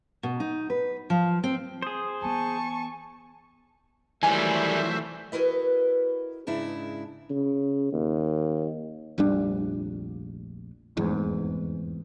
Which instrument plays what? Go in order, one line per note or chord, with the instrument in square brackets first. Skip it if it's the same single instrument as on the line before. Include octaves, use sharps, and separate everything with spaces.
[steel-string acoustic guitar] B2
D#4
B4
F3
C4
[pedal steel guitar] G#4 C5 [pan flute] D#6
[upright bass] E3 B3 [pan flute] G#5 [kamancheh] A5 C#6
[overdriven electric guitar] D#3 G3 [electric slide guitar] E3 F#3 [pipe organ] A3 C5 E5 [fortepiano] G#5
[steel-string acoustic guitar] E4 F#4 A#4 B4 D#5
G#2 C#3 D4 E4
[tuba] C#3
D#2
[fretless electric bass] F1 A#1 G3 D4
F1 E2 G#2